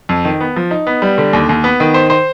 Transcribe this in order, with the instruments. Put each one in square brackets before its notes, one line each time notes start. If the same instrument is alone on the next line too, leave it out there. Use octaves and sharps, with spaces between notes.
[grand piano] F2
D#3
B3
F3
D#4
B3
G3
D3
D#2
D#2
B3
D#3
C5
C5